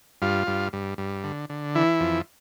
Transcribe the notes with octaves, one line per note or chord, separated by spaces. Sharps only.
G2 F4
G2
G2
G2
D3
D3
E3 E4
F2